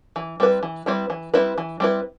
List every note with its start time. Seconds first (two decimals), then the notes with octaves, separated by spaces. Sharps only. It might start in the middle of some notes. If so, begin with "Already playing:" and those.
0.16 E3
0.40 G3 C4 E4 B4
0.63 E3
0.86 G3 C4 E4 B4
1.10 E3
1.34 G3 C4 E4 B4
1.58 E3
1.80 G3 C4 E4 B4